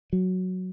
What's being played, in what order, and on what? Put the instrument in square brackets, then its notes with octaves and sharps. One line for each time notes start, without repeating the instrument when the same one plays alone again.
[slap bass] F#3